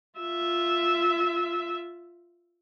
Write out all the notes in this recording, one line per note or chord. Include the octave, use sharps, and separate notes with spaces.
F4 E5